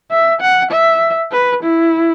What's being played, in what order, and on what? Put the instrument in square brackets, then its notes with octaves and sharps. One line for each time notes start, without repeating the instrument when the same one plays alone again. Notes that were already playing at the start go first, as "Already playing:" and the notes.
[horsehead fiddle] E5
F#5
E5
B4
E4